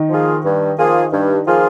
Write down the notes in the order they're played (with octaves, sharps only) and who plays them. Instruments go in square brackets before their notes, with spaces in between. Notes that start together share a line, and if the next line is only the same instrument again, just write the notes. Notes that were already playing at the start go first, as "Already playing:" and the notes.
Already playing: [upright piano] D#3 D#4
[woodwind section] F3 A#3 F4 G#4
G2
F3 A#3 F4 G#4
G2
F3 A#3 F4 G#4